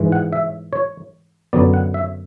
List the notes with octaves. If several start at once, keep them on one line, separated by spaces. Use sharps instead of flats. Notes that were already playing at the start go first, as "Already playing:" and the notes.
Already playing: G#2 E3 G#3
F#5
E5
C#5
F#2 D3 F#3 B3 D5
F#5
E5